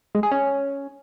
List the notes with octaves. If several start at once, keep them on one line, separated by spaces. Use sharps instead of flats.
G#3
G#4
C#4